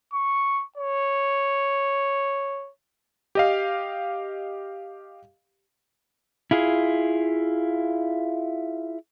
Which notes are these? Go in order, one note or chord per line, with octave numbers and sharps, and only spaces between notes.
C#6
C#5
G4 D#5 F5
E4 F4 G#4